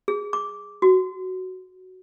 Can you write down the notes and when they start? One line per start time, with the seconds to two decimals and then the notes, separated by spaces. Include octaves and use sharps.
0.08 G#4
0.33 D6
0.82 F#4